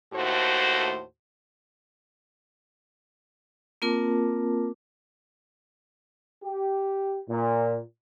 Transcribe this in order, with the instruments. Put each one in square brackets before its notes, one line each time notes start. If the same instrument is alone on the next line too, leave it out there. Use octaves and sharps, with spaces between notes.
[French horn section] D#2 A2 A3 F#4 C5
[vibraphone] A#3 C4 F4 A#4 A5 D6
[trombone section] G4
A#2